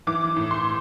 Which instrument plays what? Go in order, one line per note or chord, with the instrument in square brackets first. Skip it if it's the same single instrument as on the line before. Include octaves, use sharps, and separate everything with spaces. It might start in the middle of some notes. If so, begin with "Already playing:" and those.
[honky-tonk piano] E3 D6
A2
C6